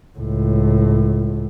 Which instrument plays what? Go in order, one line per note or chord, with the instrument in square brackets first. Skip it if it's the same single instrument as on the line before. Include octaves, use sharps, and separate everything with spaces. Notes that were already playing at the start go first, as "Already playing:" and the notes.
[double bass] C#2 A2